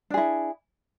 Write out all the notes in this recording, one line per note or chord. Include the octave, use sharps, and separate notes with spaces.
D4 E4 G#4